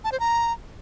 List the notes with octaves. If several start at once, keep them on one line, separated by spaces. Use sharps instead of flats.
A5
C5
A#5